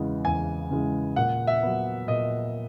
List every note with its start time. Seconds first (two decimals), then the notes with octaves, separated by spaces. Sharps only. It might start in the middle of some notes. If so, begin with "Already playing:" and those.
Already playing: E2 C#3 E3 G#3
0.25 E2 G#5
0.71 C#3 E3 G#3
1.16 A#2 F#5
1.47 E5
1.62 F#3 B3
2.07 A#2 D#5